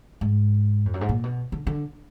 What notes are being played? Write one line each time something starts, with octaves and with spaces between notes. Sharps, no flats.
G#2
F2
F#2
G#2
A#2
B2
D3
D3